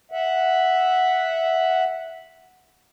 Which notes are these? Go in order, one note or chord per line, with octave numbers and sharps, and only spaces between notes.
E5 F#5